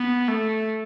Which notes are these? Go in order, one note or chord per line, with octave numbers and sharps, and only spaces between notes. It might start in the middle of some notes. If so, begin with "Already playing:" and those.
Already playing: B3
A3